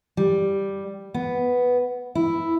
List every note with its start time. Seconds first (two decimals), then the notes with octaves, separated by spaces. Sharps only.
0.17 G3
1.14 B3
2.15 E4